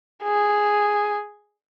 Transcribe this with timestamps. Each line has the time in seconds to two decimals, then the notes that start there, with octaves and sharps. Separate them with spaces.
0.23 G#4